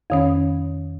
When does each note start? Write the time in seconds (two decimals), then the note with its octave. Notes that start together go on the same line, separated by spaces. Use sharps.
0.10 F2 D#3 C#4